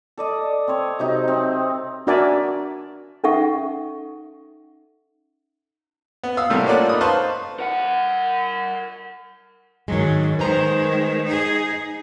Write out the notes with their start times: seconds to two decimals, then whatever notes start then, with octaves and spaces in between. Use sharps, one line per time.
0.18 A4 D5 D#5
0.68 C4 C#5
0.99 C3 F#3 D#4
1.28 C4
2.07 D4 F#4 A#4 D5 E5 G#5
3.24 C#4 D#4 A4 E5 F#5 C#6
6.24 B3
6.37 F5 D#6 E6
6.50 A2 C3 G3 A3 A#3
6.66 A#3 C#4 F4 A4 D5 F#5
6.89 D#4 B5 D#6
7.01 B4 C5 F5 A5 C6 C#6
7.59 A#4 F#5
9.88 G#2 D#3 F#3 G#3
10.39 D#3 G#3 B4 C5 A#5
11.25 D#4 G#4